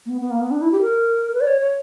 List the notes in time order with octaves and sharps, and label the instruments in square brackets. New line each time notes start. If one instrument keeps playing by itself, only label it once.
[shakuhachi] A#3
B3
B3
A#3
B3
D4
E4
G4
A#4
B4
D5
C#5
C#5